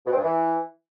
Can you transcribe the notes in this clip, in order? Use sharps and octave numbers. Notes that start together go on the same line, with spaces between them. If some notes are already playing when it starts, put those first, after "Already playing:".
B2
C4
G2
E3